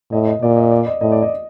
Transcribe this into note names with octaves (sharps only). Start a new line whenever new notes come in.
A2 D#5
D#5
A#2 D5
D#5
D5
D#5
A2 D#5
D5
D#5